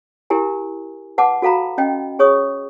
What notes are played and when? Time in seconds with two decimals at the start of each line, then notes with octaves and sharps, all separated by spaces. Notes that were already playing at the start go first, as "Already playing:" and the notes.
0.30 E4 G4 A#4 G#5
1.18 B4 F#5 A5 D6
1.42 F#4 A4 F5 A#5 B5
1.78 C#4 D#5 G5
2.19 G#4 C#5 C#6 D#6